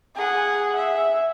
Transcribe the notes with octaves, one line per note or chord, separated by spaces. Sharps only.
G#4 F#5
E5